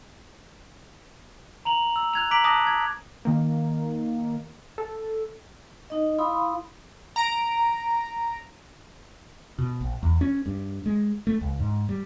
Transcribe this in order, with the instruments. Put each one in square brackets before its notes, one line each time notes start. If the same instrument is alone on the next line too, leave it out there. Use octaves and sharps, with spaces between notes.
[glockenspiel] A#5 F7 F#7
E6
F#6 G#6 F7
A#5 D6 F#6 B6 D7 F#7
A5 D6 D#6 F#6 A#6
G#6
[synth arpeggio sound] D#3 A#3
A4
[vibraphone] D#4 D#5
E4 F5 B5 C6 D#6
[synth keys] A#5 A#6 D7
[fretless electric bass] B2
A#1
E2
C#4
G2
G#3
A3
C#2
G#2
G3